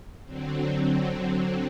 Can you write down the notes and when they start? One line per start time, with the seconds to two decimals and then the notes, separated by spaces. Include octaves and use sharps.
0.25 D3 F#3 C4